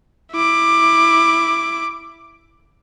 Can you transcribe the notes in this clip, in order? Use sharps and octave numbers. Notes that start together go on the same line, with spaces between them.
E4 D6